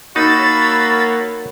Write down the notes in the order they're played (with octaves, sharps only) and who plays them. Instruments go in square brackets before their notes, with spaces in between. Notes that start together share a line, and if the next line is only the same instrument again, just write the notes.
[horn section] A#3 F#4 C#5 [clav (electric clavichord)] D#4 [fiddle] B5 E6 [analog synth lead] A6